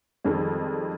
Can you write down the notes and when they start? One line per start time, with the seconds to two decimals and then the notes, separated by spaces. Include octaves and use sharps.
0.24 F2 D#3 G3 G#3